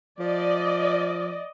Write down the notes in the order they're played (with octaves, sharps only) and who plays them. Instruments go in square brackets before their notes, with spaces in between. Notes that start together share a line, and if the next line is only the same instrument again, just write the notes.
[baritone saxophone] F3 [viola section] D5 D#5